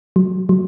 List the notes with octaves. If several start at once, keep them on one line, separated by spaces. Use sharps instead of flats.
F#3
F#3